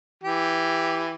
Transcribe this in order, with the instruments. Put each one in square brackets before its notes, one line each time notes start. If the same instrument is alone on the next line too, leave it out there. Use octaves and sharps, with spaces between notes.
[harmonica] E3 G4